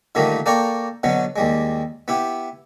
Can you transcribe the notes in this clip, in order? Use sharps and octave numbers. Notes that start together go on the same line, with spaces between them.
A#2 D3 D#3 G3 A3 A#3
A#3 A4 D5 G5 A#5 C#6
B2 D3 F#3 B3
D#2 G3 G#3
B3 E4 G4